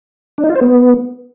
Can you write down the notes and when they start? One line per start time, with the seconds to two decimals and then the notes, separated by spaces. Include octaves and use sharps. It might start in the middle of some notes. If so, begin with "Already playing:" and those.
0.38 D4
0.44 D#4
0.50 F4
0.55 C5
0.61 B3